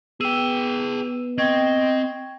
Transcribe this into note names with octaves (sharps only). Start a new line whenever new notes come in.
B3 G#4 G5 E6 D#7 E7
C4 D#5 G5 C#6 G#6